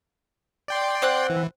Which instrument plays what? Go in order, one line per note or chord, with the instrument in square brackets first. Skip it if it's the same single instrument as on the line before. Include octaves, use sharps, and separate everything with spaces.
[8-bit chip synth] D5 G5 C6
[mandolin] C4 F#5 F#6
[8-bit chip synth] E3